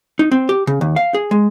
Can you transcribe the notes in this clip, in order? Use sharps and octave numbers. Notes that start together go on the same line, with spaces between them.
D#4
C4
G4
C#3
D#2
F5
G#4
G#3